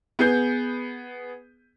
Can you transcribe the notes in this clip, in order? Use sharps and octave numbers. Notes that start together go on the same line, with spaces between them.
B3 G#4 G6